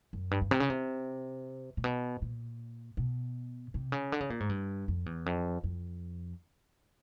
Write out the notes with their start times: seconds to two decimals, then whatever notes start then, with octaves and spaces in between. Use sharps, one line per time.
0.13 F#2
0.31 G2
0.42 G2
0.51 C3
0.60 C#3
0.70 C3
1.77 A#2
1.84 B2
2.22 A#2
2.97 B2
3.74 C3
3.92 C#3
4.12 D3
4.20 C#3
4.30 A#2
4.40 G#2
4.49 G2
4.88 F2
5.06 E2
5.26 F2
5.64 F2